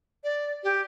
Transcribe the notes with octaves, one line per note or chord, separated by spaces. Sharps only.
D5
G4